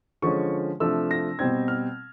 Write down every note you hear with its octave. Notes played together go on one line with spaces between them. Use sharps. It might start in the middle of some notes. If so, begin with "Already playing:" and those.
D3 F3 G#3 C#4 C#6
C3 F3 A3 D4 E6
A#6
B2 G3 C4 G#6
F6